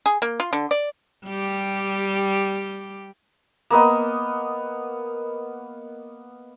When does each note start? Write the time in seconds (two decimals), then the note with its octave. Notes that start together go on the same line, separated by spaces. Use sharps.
0.06 G#4
0.22 A#3
0.40 F4
0.53 D3
0.71 D5
1.27 G3 G4
3.70 A#3 B3 D#5